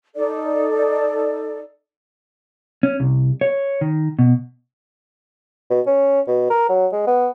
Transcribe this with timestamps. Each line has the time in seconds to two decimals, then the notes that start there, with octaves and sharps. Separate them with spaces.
0.15 D#4 A4 D5
2.83 C#4
3.00 C2
3.41 C#5
3.81 D#3
4.19 B2
5.70 B2
5.87 C#4
6.28 B2
6.50 A#4
6.69 F#3
6.92 G#3
7.07 B3